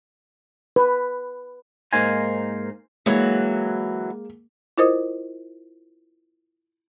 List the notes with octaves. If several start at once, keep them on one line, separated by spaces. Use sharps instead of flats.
B4
G#2 A#3 D#4 A#4 C5 G#5
E3 F#3 G#3 A#3
E4 F4 A#4 C5 D#5 D#6